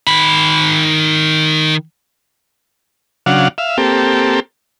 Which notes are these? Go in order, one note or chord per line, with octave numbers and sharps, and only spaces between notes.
D#3 B5
C#3 F#3 D4 F5 F#5
E5 F5
A#3 C4 G4 A4